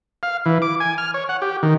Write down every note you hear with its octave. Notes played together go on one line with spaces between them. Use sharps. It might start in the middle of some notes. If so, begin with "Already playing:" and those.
F5
E3
D6
G#5
F6
C#5
F#5
G4
D#3